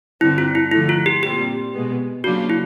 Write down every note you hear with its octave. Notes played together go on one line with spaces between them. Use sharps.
G2 D3 G3 C4 E4
F4
E4
D3 F3 A3 E4
F4
G4
A#2 G3 C4 G4
B2 G#3 B3
C#3 F#3 A#3 D4 F4 F#4
E4